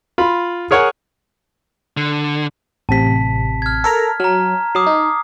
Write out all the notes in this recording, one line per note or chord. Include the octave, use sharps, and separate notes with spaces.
F4 B5
G#4 A#4 C#5 F#5 G#5
D3
A1 C3 A5 B6
F6 G#6
A4 A#4 A#5 F6
F#3 A#5 F6
F#3 D6 D#6 C7
D#4